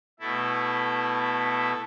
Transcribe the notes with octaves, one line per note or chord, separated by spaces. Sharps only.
B2 A3 E4 A4